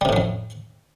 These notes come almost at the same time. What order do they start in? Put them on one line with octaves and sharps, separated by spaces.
G3 C3 A2 F#3 F2